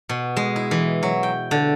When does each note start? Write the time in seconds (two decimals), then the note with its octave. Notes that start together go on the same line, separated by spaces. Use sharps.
0.09 B2
0.37 G#3
0.56 E4
0.71 E3
1.03 F#3
1.23 G5
1.51 D3